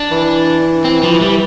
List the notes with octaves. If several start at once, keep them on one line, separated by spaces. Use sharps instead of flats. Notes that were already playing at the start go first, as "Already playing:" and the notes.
Already playing: D4
E3
C4
F3
G3